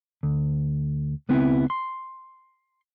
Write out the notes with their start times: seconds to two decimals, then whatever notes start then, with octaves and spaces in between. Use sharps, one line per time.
0.23 D2
1.29 C#2 B3 C4 E4
1.70 C6